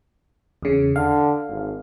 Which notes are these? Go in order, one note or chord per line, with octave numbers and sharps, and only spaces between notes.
E2 C#3
D3 F5
G#1